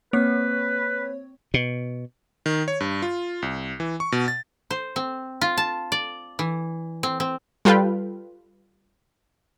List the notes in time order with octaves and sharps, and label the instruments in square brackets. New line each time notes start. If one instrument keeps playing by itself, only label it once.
[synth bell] A#3 [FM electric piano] C4 C#5 [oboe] B4
[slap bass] B2
[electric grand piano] D#3
C#5
G2
F4
C2
E3
C#6
B2
A6
[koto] C5
C4
F4
A5
D5
E3
C4
C4
[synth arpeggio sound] G3 F4 A4 B4 F5 G5